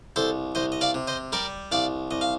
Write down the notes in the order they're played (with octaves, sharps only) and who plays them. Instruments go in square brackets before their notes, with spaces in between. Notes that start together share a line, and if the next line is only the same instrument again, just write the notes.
[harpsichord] C2 A4 C5
C2 C5 D#5
D#5
D5 F5
C3
C5 D#5
G3 A#4 D5
C2 D5 F5
C2 D#5
F5